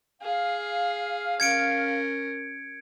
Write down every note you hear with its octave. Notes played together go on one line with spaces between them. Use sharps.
G#4 F5
C#4 A#4 G#6 C#7 D7